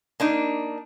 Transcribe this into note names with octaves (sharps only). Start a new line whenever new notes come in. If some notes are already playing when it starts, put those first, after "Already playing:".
A#3 D4 D#4